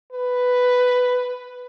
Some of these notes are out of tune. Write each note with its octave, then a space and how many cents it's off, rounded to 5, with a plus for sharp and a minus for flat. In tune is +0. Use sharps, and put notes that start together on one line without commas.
B4 +5